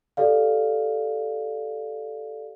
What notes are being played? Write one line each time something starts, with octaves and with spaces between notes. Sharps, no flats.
G4 A4 D5 F5